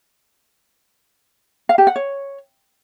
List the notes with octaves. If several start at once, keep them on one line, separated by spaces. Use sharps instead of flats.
F5
G4
F#5
C#5